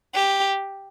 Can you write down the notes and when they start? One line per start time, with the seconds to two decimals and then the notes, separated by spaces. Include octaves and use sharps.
0.15 G4